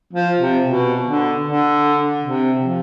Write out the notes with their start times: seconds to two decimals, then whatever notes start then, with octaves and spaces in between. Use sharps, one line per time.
0.13 F3
0.40 C3
0.66 B2
1.05 D3
1.45 D3
2.24 C3
2.62 F3